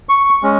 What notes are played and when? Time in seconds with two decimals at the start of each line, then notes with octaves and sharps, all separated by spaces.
0.09 C#6
0.43 G#3 C#4